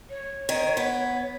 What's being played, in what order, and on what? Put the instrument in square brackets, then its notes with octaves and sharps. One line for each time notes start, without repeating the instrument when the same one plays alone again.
[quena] C#5
[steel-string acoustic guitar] D#3
B3